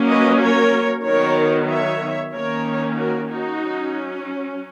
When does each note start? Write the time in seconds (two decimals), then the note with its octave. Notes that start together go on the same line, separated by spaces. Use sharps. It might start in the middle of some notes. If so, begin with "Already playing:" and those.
Already playing: F#3 A#3 C#4
0.09 B4 D#5
0.41 A#4 C#5
1.05 D#3 F#3 B3 A#4 C#5
1.69 C#5 E5
2.33 D#3 A#3 C#4 A#4 C#5
2.97 F#4 A#4
3.29 D#4 F#4
3.62 F#3 C#4